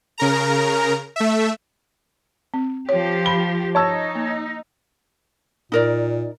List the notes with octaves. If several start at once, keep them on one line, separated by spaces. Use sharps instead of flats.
C#3 A#4 A#5
A3 E5
C4
F3 G4 C#5
B5 G7
D#4 C#5 A5 E6
A#3
A#2 D#4 A#4 D5